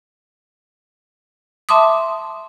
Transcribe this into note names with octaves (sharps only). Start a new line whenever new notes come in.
E5 A5 C6 D6 D#6